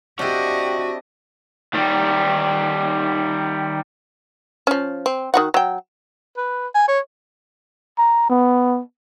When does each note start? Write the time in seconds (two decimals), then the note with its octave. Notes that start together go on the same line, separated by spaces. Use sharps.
0.19 C4 D4 E4 F#4 G4 D5 D#5
1.73 D#3 G3
4.67 F3 C#4
5.06 C4
5.34 D#3 F#4 F#5
5.54 F#3 G5
6.37 B4
6.75 G#5
6.88 C#5
7.98 A#5
8.30 B3